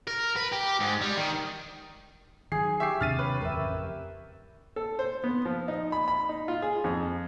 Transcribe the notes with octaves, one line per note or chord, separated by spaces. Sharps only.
A#4
B4
G4
G#2
G3
D#3
D#3 E3 F#3 G#4 C7
G4 E5 C#6 C7
D#2 C3 D4 F6 A6 D#7
B4 C#5
A1 F2 C#3 A#4 E5
A4
C5
B3
F3
D#4
B5
B5
D#4
F4
G#4
F2